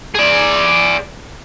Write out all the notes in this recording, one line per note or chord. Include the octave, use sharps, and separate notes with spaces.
G#4 D5